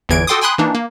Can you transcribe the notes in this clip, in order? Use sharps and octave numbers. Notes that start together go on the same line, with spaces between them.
G1 E2 E3 G#6 D7
F#4 A4 G5 C6 D6 D#6
G5 G#5 B5 C6 D#6 F#6
E3 A#3 D4 D#4
A#3